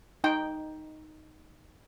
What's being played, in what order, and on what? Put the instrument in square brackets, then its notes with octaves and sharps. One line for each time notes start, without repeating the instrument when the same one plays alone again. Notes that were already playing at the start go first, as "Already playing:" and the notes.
[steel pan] D#4 G5